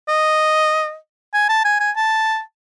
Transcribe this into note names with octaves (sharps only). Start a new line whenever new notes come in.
D#5
G#5
A5
G#5
G#5
A5